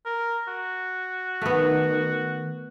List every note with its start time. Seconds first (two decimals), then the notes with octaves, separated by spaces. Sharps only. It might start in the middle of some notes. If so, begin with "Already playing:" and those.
0.06 A#4
0.48 F#4
1.42 D#3 A3 B3